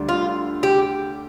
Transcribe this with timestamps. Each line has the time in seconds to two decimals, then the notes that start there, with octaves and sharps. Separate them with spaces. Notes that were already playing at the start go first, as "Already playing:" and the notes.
Already playing: D2 D3 G3 D4
0.09 F4
0.63 G4